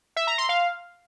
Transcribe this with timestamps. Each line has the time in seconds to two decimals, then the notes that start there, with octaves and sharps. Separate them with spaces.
0.16 E5
0.27 A#5
0.38 C6
0.49 F5